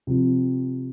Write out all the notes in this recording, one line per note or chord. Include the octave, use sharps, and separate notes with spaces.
C3 F3 C4